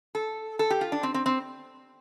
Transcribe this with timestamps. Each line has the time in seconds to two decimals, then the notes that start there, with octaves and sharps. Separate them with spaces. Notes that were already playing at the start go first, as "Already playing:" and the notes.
0.15 A4
0.59 A4
0.70 G4
0.81 F4
0.92 D4
1.03 C4
1.14 C4
1.26 C4